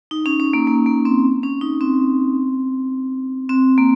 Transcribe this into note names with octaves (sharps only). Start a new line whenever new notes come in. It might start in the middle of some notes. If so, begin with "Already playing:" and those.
D#4
C#4
C#4
A#3
A#3
A#3
C4
C#4
D#4
C4
C4
A#3